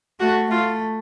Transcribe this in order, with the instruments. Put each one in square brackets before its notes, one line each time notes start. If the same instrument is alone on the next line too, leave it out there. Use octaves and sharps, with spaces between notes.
[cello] A3 [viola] F#4
[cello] A3 [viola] F4